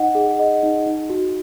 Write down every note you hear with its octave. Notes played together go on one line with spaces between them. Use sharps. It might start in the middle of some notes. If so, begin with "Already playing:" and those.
Already playing: D#4 D#5 F#5
G#4
D#5
D#4
D#4
F#4